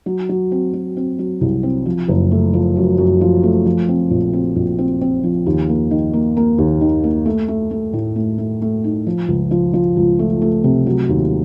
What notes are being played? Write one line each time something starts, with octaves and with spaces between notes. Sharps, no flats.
F#3
F#3
C4
F#3
C4
F#3
C2
C4
F3
F#1
A3
F3
F#2
F#2
F3
A3
F3
C4
A#1
C4
A#1
C4
C4
F3
D#2
A#3
D#3
A#3
A#3
D#2
D#3
A#3
A3
A3
A3
A2
A3
A3
A3
D#4
F3
C#2
F3
F3
C#2
A3
A3
C3
F#3
D#2